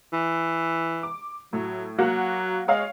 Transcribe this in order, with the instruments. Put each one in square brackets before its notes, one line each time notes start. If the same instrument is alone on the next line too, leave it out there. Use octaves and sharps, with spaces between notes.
[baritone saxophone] E3
[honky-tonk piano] D6
[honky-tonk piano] A2 [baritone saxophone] F#3
[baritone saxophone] F#3 [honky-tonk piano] A#3 F#4 F#5
[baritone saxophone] G#3 [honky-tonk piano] C#5 F5 F6